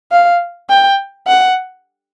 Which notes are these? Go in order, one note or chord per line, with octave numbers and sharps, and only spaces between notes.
F5
G5
F#5